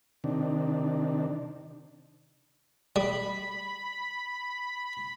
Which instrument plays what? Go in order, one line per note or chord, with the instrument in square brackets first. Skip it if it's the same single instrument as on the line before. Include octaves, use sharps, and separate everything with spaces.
[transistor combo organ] C3 D#3 D4
[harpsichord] G3 [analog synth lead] B5